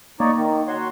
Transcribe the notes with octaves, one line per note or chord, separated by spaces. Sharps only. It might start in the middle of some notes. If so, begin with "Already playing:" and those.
A#3 D#4 C#5 D5
D#3
F#4 C#5 C6